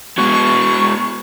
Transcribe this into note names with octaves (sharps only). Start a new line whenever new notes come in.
G#3 B3 F#4 C#6